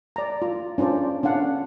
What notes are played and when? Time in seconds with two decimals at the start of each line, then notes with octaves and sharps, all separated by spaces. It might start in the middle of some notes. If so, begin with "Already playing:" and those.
0.16 D5 A#5
0.42 F4
0.78 C#4 D4 F4 C5 D5
1.23 C#4 D4 F5 F#5